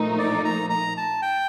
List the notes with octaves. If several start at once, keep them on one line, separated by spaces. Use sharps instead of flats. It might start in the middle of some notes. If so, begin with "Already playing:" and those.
Already playing: A#2 F3 A3 D#4 A#4
D5
A#5
A#5
A5
G5